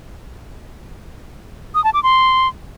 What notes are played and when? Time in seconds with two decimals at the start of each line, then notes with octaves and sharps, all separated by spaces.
1.75 D#6
1.84 A5
1.94 D6
2.03 C6